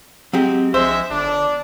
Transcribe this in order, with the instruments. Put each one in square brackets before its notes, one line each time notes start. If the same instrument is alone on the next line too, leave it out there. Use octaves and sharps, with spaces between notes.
[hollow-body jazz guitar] F#3 G#3 G4 [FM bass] C4
[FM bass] A#1 [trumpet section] G#3 E5 [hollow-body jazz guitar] C5
[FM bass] G1 [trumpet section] D4